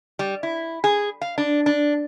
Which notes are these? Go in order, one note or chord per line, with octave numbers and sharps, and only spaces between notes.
G3
E4
G#4
F5
D4
D4